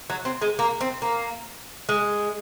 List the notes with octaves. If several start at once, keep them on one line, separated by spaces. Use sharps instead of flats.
F#3
C4
G#3
A#3
C4
A#3
G#3